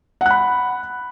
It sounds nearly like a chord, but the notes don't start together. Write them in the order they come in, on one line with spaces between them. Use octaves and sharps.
F#5 F#6 B5